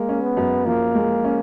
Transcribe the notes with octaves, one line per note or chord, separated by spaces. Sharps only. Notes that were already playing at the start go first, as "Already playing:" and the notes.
Already playing: G#3 A#3
C#4
B3
F#2
F3 A#3
G#3
C#4